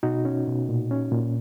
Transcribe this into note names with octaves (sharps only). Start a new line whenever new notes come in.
B2 D#4 F#4
C#4
B2
A#2
C#4
A#2